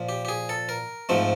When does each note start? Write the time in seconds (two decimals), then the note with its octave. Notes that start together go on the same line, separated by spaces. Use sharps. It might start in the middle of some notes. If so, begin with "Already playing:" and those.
Already playing: A#2 F3
0.09 G4
0.25 G4
0.28 G#4
0.49 A4
0.69 A#4
1.09 G#2 F3 A3 C4